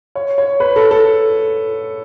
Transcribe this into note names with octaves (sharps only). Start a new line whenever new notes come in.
C#5
C#5
B4
A4
A4